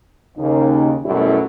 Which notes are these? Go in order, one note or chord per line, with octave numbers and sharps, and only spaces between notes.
D#2 C#3 D#4
F#2 B2 G3 A3 E4